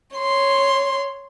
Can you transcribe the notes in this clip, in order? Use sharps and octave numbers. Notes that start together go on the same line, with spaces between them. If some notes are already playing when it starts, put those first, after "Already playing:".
C#5 C6